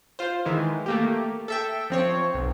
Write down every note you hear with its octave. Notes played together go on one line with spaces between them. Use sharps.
F4 C5
D#3 E3 G#3
A3 A#3 G4
A4 E5 G5
F3 C4 C#5
B1